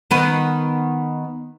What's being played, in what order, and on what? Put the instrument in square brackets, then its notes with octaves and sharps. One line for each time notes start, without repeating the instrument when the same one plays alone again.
[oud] D#3 B3 B4